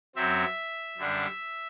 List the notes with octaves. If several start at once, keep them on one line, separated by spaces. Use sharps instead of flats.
F#2 F#3 C4 E5
F#2 D3 G3 D4